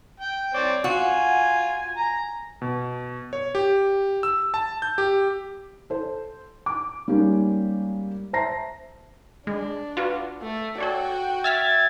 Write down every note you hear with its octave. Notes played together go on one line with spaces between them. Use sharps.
G5
C4 C#5 D5
F4 F#4 G#5
A#5
B2
C#5
G4
E6
A5
G6
G4
A4 C5
D6
G3 G#3 A#3 C#4 D#4 G4
C5 E5 A5 A#5 A#6 C7
G#3 D4
F4 F#4 B4
A3
F#4 A4 C#5 D5 G5
E5 E6 F6 G#6 A6 B6